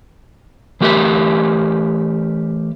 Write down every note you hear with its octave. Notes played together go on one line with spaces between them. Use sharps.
E3 A3 G4 A#4 E5